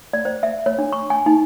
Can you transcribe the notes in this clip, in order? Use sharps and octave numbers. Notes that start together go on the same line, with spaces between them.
D5
C5
E5
C#5
D4
C#6
G#5
D#4